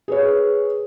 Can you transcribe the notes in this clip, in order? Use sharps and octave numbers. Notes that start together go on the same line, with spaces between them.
G#4 B4 C#5